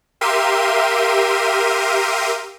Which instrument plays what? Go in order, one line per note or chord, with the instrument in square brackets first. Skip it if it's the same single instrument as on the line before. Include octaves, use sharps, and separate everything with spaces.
[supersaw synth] G4 A#4 E5 F5 C6 D#7